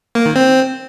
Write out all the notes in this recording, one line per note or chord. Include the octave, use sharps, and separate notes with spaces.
A#3
D#3
C4